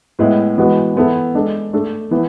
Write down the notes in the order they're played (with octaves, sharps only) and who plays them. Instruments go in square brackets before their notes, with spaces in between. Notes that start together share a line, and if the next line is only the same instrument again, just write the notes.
[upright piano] A2 G#3 B3 E4
E3 G#3 B3 F#4
E3 B3 E4 A4
G#3 D4 A4
A3 D4 A4
E3 B3 E4